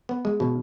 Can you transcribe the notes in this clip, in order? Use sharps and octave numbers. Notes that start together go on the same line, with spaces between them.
B3
G#3
B2